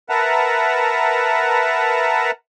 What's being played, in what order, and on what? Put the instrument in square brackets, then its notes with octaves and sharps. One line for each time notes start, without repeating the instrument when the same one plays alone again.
[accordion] A#4 B4 E5 F#5 A5 A#5